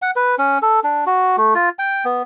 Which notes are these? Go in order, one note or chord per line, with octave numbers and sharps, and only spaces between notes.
F#5
B4
C#4
A4
D4
F#4
A3
F4
G5
B3